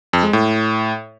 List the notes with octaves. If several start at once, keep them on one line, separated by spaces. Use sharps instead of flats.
F2
G#3
A2